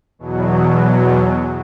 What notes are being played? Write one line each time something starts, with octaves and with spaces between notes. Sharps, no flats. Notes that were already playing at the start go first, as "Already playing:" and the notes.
E2 B2 F#3